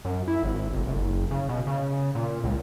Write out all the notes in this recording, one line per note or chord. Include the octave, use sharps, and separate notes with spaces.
F#2
E4
G#1
F1
F#1
C#3
B2
C#3
A#2
C#2